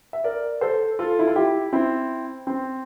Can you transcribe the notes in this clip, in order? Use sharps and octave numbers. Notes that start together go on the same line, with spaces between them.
E5
A#4 D5
A4 C5
F4 A4
E4
F4
E4 G4
C4 E4
C4